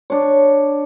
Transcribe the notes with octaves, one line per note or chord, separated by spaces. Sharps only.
D4 C#5